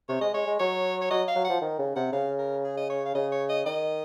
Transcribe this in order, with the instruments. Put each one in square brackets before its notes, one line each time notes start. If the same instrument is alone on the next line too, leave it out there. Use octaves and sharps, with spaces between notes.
[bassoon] C3 [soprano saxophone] C#5
[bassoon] G#3 [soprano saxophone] D#5
[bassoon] G#3 [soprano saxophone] C#5
[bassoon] G#3
[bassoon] F#3 [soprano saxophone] C#5
[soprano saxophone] C#5
[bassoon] F#3 [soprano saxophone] D#5
[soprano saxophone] F5
[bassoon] F#3
[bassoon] F3 [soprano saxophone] F#5
[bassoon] D#3
C#3
[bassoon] C3 [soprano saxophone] F#5
[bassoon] C#3 [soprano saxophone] F5
[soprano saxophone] A#4
G#4
D#5
C#5
F5
[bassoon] C#3 [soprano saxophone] D#5
[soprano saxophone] C#5
D#5
[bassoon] D#3 [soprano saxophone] D#5